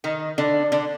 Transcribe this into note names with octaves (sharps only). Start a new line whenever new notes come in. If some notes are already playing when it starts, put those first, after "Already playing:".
D#3 D#4
D3 D4
D3 D4